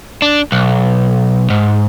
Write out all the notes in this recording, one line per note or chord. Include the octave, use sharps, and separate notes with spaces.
D4
B1
G#2